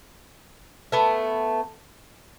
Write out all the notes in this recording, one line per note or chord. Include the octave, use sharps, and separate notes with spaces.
A3 B3